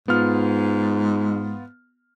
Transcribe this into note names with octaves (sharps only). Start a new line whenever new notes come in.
G#2 B3 F4 F6